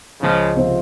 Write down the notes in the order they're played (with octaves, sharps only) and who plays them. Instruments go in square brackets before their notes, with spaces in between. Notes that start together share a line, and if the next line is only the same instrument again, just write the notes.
[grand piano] C#2 [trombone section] C#3 F3
[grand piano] C3 F3 C4 F4